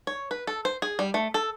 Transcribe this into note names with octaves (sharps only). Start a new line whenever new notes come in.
C#5
B4
A4
C5
G#4
G3
A3
A4